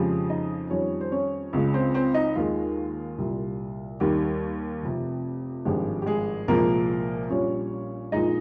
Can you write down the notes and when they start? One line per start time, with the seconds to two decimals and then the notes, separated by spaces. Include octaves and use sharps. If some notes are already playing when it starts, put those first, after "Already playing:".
Already playing: F2 C#3 F3 G#3 G4
0.29 D#4 D#5
0.70 F2 D#3 G3 C#4 C#5
1.01 C5
1.12 C#4 C#5
1.53 C#2 C#3 G#3
1.74 C4 C5
1.94 C4 C5
2.14 D#4 D#5
2.35 D#2 D#3 G#3 F4
3.18 C2 A#2 G3
4.00 D#2 D#3 G3 G4
4.83 F1 F2 C3
5.65 G#1 G2 F3 G#3 G4
6.02 G4
6.06 G#3 G#4
6.48 C2 A#2 F3 G#3 A#3 A#4
7.30 A#1 A#2 G3 C#4 C#5
8.12 A#1 A#2 G#3 D#4 D#5